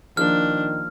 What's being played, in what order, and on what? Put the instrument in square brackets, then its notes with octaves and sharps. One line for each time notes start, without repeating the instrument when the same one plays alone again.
[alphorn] D#3 [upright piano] F3 A#3 [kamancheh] D4 [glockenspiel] F6